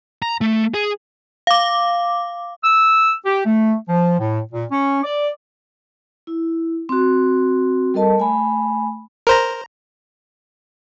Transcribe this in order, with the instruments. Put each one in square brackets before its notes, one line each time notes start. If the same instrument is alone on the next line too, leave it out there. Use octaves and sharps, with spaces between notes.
[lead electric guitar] A#5
A3
G#4
[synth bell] F5 D6
[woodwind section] E6
G4
A3
F3
A2
A#2
C#4
D5
[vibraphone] E4
C4 F#4
G3 A4 A#4 D#5 A5
A3 G#5 B5
[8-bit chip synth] A#4 C5 A#5